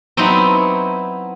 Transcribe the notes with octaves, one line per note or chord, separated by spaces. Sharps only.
F#3 B3 C4 D#4 E4 F#4